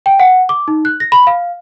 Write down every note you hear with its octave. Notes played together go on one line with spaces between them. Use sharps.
G5
F#5
D6
D#4
F#6
A#6
B5
F5